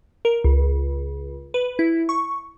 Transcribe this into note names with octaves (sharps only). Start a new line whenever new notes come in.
A#4
C#2
B4
E4
C#6